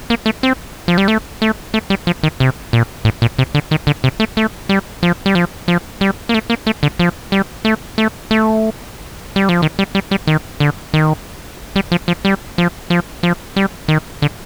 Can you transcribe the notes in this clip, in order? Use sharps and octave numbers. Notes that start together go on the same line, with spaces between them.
A#3
A3
C4
F3
G3
A3
A3
A3
G3
F3
D#3
C3
A#2
A2
A#2
C3
D3
D#3
D3
C3
A3
A3
G3
F3
G3
F3
F3
G3
A#3
A3
A#3
A3
D3
F3
G3
A3
A3
A3
G3
F3
D#3
G3
G3
G3
D#3
D3
D#3
G3
F3
F3
G3
F3
F3
F3
G3
D#3
D3